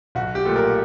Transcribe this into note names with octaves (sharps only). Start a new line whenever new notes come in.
B1 F#4
G4
A#2 F3 A3
A#4